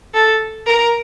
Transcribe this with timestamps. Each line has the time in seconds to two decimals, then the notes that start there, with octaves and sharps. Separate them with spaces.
0.14 A4
0.67 A#4